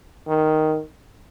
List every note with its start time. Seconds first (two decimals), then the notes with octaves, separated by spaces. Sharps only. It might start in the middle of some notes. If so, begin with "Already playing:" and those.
0.28 D#3